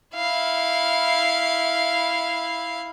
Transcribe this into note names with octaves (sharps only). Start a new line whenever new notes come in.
E4 F5